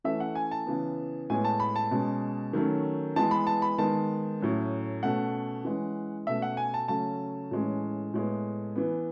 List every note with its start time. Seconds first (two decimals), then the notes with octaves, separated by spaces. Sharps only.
0.04 E3 A3 C#4 E5
0.20 F#5
0.35 G#5
0.51 A5
0.66 C#3 E3 B3
1.30 A2 G#3 B3 G#5
1.44 A5
1.60 B5
1.76 A5
1.91 B2 G#3 C#4
2.53 D#3 F#3 A3 C#4
3.16 E3 G#3 B3 A5
3.31 B5
3.47 A5
3.62 B5
3.78 D#3 G#3 B3 A5
4.40 A2 F#3 C#4
5.03 B2 A3 C#4 F#5
5.65 E3 G#3 C#4
6.27 B2 A3 C#4 E5
6.42 F#5
6.57 G#5
6.74 A5
6.88 C#3 F#3 A3 C#4 A5
7.51 A2 E3 G#3 C#4
8.14 A2 G#3 B3
8.76 E3 B3